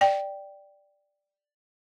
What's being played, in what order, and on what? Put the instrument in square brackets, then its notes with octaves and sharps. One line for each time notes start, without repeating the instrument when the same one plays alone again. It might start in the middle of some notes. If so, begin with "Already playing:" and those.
[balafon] D5 G5